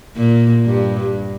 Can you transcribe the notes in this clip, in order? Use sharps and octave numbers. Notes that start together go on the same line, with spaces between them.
A#2
G2